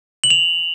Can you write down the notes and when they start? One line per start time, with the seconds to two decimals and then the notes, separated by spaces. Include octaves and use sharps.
0.24 F#7
0.30 F7